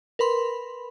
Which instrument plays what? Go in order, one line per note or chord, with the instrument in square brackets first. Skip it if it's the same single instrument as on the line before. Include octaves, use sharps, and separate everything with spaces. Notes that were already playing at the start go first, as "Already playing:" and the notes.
[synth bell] A#4 B4 B5 C6